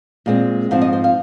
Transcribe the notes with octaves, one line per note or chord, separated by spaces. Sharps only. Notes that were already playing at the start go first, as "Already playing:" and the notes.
A#2 G#3 C4
G#2 F3 C4 F5
D#5
C5
F5